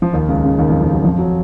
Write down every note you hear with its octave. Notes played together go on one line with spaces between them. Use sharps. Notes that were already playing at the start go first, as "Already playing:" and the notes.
F3
D#2 D#3
C#2 C#3
D#3
C#2 C#3
D#2 D#3
F2 F3
F2 F3
F#2 F#3
F2 F3
F#3